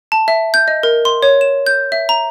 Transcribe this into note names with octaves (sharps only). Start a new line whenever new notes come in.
A5
E5
G6
D#5
A#4
C6
C#5
E7
G6
E5
A#5